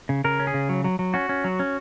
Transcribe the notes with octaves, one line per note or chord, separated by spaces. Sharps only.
C#3
C#3 A#4
C#4
G#4
C#3
F#3
F#3
F#3
C#4 F#4
C#4
F#3
C#4